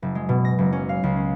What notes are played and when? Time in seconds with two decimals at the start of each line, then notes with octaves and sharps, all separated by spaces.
0.02 F#1
0.15 G#3
0.29 B2
0.45 A#6
0.58 F#1
0.73 C#4
0.89 F5
1.03 C#2
1.17 C#4